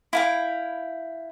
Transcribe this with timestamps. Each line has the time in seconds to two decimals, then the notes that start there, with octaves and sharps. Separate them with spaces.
0.13 E4 F5 G5